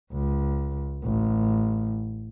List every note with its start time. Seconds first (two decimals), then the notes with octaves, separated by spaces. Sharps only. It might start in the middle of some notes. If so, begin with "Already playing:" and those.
0.12 C#2
1.04 A1